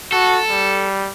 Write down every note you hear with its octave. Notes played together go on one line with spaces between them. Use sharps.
F#4 A4
G3